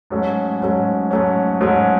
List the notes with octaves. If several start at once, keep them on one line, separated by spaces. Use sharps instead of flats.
G#2 F#3 A3 C#4
G#2 F#3 A3 C#4
G#2 F#3 A3 C#4
G#2 F#3 A3 C#4